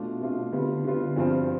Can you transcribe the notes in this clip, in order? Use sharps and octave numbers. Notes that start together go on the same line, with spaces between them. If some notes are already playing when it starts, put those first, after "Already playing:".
Already playing: B2 A3 D4 F4
B2 A3 D4 F4
D3 G3 B3 F4
D3 G3 B3 F4
G2 F3 C4 F4